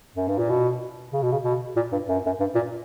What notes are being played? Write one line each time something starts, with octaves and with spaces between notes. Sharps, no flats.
F#2
G2
A#2
B2
C#3
B2
C#3
B2
A#2
G2
F#2
F#2
G2
A#2